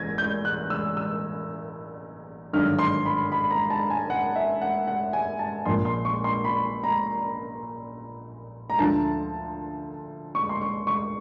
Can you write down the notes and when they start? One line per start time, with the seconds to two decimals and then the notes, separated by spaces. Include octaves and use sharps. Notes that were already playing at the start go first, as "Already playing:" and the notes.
Already playing: A1 G#6 A#6
0.18 G6
0.45 F#6
0.70 E6
0.97 E6
2.53 G#1 G2 D3 F#3 F6
2.79 C6
3.05 B5
3.32 B5
3.51 A#5
3.70 A5
3.90 G#5
4.10 F#5
4.36 E5
4.62 F#5
4.87 F#5
5.13 G#5
5.39 A5
5.66 A#1 A#2 F3 C6
5.85 C6
6.05 C#6
6.24 C6
6.44 B5
6.83 A#5
8.70 A#5
8.79 D2 D3 F3 A5
10.35 C#6
10.49 C6
10.61 C#6
10.87 C#6